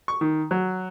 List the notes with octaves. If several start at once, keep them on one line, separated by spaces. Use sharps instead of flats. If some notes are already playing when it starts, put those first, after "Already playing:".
C#6
D#3
F#3